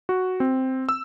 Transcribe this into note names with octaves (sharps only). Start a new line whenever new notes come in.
F#4
C4
E6